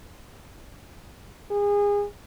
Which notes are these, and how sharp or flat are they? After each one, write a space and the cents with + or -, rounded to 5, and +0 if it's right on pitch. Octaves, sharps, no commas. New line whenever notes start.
G#4 -30